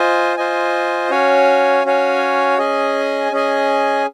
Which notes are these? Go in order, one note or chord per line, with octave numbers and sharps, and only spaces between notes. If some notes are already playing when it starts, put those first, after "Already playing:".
Already playing: F4 C5 D#5 G#5
F4 C5 D#5 G#5
C#4 F#4 C#5 F5 G#5
C#4 F#4 C#5 F5 G#5
C#4 G#4 D#5 G#5
C#4 G#4 D#5 G#5